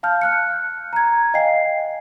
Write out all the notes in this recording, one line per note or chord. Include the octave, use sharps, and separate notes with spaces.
F5 A5 F6 G6
F6 F#6 C#7
A#5 G#6
D#5 F5 G5 G#5 C7